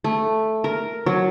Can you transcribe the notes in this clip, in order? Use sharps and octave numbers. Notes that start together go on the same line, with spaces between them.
A3
A#4
F#3